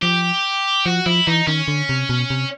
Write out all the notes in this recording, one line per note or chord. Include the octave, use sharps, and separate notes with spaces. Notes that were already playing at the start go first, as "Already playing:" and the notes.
F3 G4
F3 F#4
F3 E4
E3 D#4
D#3 C#4
D3
C3
B2
C3